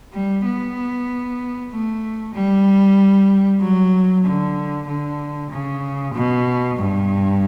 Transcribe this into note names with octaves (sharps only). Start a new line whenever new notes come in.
G3
B3
A3
G3
F#3
D3
D3
C#3
B2
G2